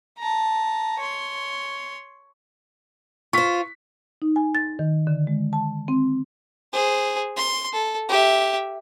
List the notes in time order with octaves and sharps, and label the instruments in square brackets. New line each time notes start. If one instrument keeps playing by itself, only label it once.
[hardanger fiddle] A5 A#5
C#5 C6
[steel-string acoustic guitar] F4 C5 [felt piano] C#6 B6
[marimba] D#4
G#5
A6
D#3
D3
G#3
A5
C4
[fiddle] G#4 C5
C6
A4
G4 E5